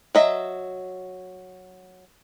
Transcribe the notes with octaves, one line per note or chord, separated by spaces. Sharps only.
F#3 D#5 E5